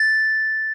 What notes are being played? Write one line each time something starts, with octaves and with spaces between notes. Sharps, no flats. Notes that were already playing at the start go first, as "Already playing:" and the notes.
Already playing: A6